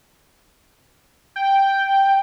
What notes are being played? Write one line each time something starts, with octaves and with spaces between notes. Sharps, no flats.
G5